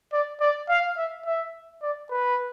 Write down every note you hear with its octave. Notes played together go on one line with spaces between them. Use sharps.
D5
D5
F5
E5
E5
D5
B4